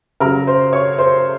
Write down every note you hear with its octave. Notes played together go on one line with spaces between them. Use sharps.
C#3 F#3 A#4 A#5
C5 C6
C#5 C#6
C5 C6